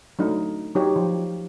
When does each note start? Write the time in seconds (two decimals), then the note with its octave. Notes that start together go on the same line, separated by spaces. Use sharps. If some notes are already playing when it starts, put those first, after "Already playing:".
0.19 F#3 A3 D4 D#4
0.75 F#3 D#4 G4 C#5
0.96 F3